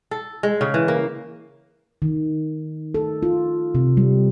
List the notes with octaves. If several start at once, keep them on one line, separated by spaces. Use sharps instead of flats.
A4
G#3
C#3
E3
A#3
D#3
A4
F4
C3
G3